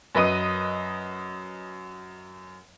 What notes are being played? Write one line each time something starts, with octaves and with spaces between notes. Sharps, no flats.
F#2 B4 D#5 D#7